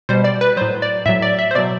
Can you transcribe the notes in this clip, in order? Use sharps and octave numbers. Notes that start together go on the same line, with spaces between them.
B2 G3 C5
D5
B4
A2 F#3 C5
D5
A2 F#3 E5
D5
E5
C5
B2 F#3 D5